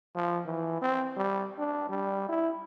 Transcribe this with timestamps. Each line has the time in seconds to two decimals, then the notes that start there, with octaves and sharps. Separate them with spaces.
0.15 F3
0.46 E3
0.82 C4
1.17 G3
1.58 D4
1.89 G3
2.29 E4